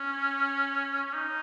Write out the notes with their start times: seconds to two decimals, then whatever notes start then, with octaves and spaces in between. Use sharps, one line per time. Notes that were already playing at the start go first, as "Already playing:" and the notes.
Already playing: C#4
1.06 C#4
1.14 D#4